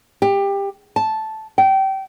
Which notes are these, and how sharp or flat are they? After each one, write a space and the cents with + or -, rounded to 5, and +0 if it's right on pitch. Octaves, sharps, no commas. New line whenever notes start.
G4 +20
A5 -5
G5 -25